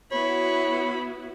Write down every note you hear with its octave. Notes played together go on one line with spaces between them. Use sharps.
B3 E4 F#4 C#5 B5